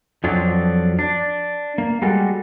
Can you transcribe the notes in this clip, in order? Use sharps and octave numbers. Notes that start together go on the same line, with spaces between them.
F2 F3 F#3 D4
D4
A#3
G3 G#3 F#4 A4